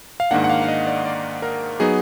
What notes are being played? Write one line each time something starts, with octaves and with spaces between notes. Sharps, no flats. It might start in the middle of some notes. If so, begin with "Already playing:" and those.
F5
G#2 D#3 A#3 D4 F#5
F#5
F5
F5
D#5
D5
D5
A#4
F#3 B3 D#4 G#4